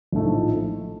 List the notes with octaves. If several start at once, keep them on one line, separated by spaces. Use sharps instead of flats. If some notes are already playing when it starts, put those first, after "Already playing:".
A#1 A2 F3 A3 D#4